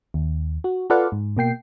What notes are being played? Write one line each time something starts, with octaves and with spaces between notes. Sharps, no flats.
D#2
F#4
F4 A4 B4 D5 F5 F#5
G#2
B2 A#3 G5 C7